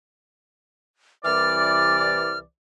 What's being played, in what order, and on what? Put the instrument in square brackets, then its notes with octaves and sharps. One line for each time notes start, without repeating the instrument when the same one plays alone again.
[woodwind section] C2 E3 D5 [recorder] F6